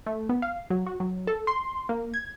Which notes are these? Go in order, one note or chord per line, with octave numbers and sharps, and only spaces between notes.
A3
B3
F5
F#3
F#4
F#3
A4
C6
A#3
G#6